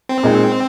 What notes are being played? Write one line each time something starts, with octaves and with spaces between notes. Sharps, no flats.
C4
A#2 G#3 D#4